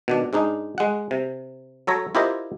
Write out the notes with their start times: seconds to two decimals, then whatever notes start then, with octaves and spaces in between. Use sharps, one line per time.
0.08 B2 D#3 D4
0.33 G#2 G#3 D4 D#4
0.78 G#3 F#5
1.11 C3
1.87 F#3 A4 C#5 A#5
2.15 E4 F4 G4 A#4 C5 D#5